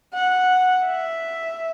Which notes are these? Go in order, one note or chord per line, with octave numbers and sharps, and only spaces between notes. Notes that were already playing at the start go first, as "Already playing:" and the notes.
F#5
E5